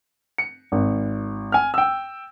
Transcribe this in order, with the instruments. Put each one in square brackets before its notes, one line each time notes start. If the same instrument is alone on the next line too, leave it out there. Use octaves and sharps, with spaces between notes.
[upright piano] C#7
G#1
G#5 F6
G5 E6